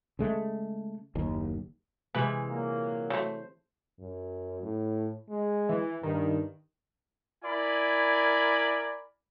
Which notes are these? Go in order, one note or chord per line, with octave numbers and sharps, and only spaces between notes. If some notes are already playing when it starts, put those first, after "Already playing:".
C#3 G#3 A3
F#1 D#2
C3 E3 G#3 B4
A#2 F#3 A#3
F#3 G3 A3 C5
F#2
A2
G#3
E3
G2 D#3
E4 A#4 D5 G#5 B5